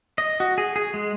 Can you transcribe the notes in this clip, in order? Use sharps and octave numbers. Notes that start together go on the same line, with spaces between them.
D#5
F#4
G#4
G#4
G#3